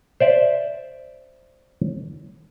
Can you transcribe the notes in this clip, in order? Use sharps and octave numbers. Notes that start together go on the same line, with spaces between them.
C5 D5 E5